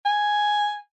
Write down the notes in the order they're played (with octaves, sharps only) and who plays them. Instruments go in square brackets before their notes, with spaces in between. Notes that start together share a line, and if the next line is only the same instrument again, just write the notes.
[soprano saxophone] G#5